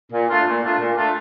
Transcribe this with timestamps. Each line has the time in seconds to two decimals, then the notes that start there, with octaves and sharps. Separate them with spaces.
0.12 A#2
0.28 A3 D4 F4
0.46 A#2
0.63 A3 D4 F4
0.79 A#2
0.96 A3 D4 F4